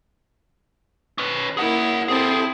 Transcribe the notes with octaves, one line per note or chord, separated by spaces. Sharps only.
C#4 B4
A#3 E4 G#4 F#5
C4 E4 G#4 A4